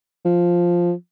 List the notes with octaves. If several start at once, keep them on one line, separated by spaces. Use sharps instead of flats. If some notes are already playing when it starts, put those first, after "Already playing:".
F3